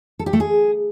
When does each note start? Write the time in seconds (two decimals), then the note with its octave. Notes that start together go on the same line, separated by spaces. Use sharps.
0.19 A4
0.26 G4
0.33 A3
0.40 G#4